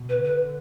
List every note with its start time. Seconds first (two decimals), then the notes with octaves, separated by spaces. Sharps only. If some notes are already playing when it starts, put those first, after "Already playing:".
Already playing: B2
0.09 B4
0.24 D3 B4